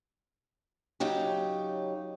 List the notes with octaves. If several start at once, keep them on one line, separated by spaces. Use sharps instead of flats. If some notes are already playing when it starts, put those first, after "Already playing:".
C#3 F#3 D#4 G4